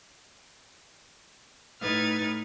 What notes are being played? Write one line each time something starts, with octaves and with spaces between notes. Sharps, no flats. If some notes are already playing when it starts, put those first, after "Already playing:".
A2 D#4 B4 F6 G#6 A6